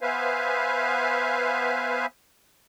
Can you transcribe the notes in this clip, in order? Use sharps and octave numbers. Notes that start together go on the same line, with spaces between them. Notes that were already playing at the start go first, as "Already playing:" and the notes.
B3 B4 C5 E5 F5 G#5